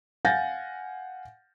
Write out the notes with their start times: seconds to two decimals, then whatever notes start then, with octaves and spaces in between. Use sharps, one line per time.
0.25 F5 F#5 G#5 G6 A6 A#6